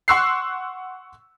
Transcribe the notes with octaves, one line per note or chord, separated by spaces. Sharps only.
F#5 C6 C#6 E6 F#6 C7